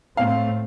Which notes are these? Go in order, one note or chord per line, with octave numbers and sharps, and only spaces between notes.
A2 A3 C4 F5